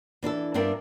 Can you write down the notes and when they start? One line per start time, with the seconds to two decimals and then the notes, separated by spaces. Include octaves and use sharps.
0.23 E3 D4 E4 A4
0.54 G2 B3 D4 F4 A#4 E5